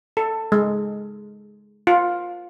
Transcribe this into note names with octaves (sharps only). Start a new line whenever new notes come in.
A4
G#3
F4